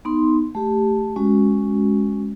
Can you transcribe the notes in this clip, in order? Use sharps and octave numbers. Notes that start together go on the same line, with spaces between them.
B3 D#4 C6
A3 G4
G#3 C#4 F#4